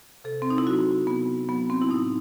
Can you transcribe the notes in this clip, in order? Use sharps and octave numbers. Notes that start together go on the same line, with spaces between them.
C3 A4
C4
D#4
E4
F#3 F#4
C3 B3
F#3 B3
C4
E4
A2 D#4